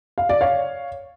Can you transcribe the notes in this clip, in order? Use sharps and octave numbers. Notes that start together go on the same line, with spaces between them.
F5
D5
C#5 F5